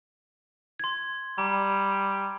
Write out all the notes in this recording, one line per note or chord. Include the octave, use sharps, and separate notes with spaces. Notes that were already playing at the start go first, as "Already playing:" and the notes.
C6 G#6
G3 A#5